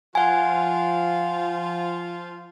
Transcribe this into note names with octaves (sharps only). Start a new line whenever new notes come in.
F3 F4 F#5 G#5